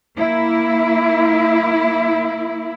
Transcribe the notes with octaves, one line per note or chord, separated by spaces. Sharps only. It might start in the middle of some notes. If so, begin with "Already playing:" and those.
A#3 E4